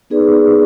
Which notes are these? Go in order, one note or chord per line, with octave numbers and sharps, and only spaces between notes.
B3 D#4 G#4 B4 D5